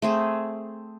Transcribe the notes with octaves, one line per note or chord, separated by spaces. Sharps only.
A3 C4 G#4